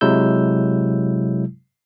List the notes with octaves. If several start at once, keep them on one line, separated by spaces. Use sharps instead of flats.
C3 F#3 G#3 E4 E6 G6